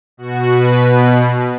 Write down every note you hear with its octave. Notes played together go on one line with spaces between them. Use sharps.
B2 F#4
B4